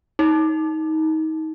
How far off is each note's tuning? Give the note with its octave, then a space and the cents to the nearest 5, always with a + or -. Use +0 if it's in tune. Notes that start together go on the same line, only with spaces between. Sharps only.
D#4 +25